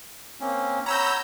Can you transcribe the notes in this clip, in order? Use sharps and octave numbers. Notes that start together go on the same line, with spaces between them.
A#3 C4 C#4
C#5 F#5 A#5 B5 E6 G6